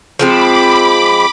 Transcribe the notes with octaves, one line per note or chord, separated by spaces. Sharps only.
F3 G#3 C4 B5 D6